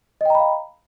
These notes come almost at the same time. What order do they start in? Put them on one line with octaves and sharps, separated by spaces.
D#5 G5 A#5 B5 F5